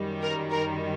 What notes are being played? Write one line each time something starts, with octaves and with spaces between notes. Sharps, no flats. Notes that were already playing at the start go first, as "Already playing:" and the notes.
Already playing: F#2 D#3 G3
A#4
A#4